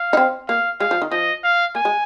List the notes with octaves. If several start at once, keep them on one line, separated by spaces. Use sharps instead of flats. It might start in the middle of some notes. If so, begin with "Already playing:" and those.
Already playing: F5
D#4
C4
A#3 F5
G#3 F5
F3
D#3
F3 D#5
F5
A#3 G#5
G#3